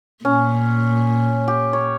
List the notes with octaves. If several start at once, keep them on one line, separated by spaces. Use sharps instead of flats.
A#2 C#4
G4
C#5